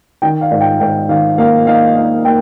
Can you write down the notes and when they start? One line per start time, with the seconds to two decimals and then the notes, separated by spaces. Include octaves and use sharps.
0.22 D#3 G5
0.41 F5
0.51 G#2
0.61 G5
0.80 G#2 G5
1.09 D#3 F5
1.38 A#3 F5
1.67 D#4 F5
1.96 D#4 F5
2.25 A#3 G5